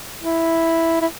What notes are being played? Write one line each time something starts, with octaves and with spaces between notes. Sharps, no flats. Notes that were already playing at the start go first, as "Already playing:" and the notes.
E4
E4